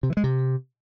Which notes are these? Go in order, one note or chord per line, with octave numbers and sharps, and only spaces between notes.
C3
E3
G#3
C3